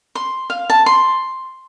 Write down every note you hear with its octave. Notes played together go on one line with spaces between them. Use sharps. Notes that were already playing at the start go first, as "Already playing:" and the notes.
C6
F5
A5
C6